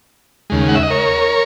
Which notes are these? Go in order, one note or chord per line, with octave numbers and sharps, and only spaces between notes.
D#2 C#3 G#3
F#5
E5
D#5
A#4 C#5